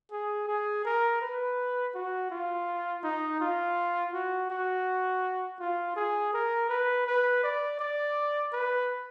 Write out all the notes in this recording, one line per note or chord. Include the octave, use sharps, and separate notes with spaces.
G#4
G#4
A#4
B4
F#4
F4
D#4
F4
F#4
F#4
F4
G#4
A#4
B4
B4
D5
D5
B4